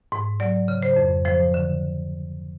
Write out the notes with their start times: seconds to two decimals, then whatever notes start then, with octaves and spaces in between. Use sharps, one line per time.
0.12 G#2
0.40 F#3 D5
0.68 C#3
0.83 C5
0.96 F2
1.25 F3 C5
1.54 D3